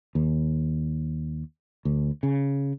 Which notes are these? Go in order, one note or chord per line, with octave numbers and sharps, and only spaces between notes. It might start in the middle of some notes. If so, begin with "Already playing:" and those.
D#2
D2
C#3